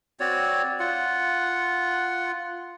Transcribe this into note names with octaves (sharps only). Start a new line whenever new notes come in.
C4 F#4 C#5 D5
F4 F#5